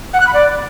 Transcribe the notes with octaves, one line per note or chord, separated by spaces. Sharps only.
F#5
F#6
B5
D5